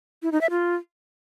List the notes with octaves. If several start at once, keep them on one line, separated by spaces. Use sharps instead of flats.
E4
D#4
E5
F4